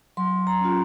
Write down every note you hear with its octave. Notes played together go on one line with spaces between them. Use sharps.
F#3 C6
A#5
C#4 F4